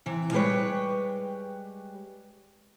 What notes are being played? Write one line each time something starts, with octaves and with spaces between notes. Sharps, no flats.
C3 E3
G3 G#3 G4 A4 B4 C#5